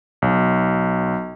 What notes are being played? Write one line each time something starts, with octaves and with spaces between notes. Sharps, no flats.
B1